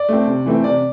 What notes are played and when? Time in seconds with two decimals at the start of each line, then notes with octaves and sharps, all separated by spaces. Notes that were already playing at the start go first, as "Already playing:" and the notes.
Already playing: D5
0.09 A3 C4
0.27 C3
0.46 E3 A3 C4
0.64 C3 D5